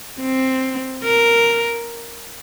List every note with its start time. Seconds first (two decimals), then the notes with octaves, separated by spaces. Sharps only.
0.20 C4
1.04 A#4